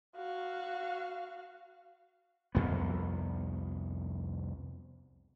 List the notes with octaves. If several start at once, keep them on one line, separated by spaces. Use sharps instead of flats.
F#4 F5
C2 F2 B3